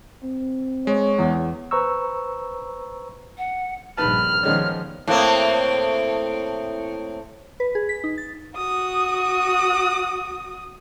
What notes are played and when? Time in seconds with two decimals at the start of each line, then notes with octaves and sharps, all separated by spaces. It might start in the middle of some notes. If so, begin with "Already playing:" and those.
0.24 C4
0.87 G#3 C#5
1.19 E2
1.71 B4 C5 A#5 C#6 E6
3.38 F#5
3.97 A#1 G2 D#3 B4 A5 B5 F6
4.43 D#3 F3 G3 G#3 B3 C#5
5.07 A2 A#3 C4
7.60 B4
7.75 G#4
7.89 B6
8.04 D#4
8.18 A6
8.56 F#4 D#6